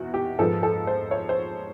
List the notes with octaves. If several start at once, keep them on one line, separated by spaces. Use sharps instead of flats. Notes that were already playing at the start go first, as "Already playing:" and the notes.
Already playing: E2 B2 E4 F#4
G4
G#2 F3 G#3 B3 A4
A4
C5
C#5
C5